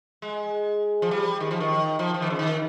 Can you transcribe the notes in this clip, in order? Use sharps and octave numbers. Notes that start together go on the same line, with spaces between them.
G#3
F3
G3
D#3
F3
D#3
F3
F3
D#3
C#3
D#3